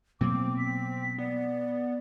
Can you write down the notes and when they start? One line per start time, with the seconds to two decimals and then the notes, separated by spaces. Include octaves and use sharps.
0.21 B2 F#3 A#3 C4 D6
0.57 B6
1.18 B3 D5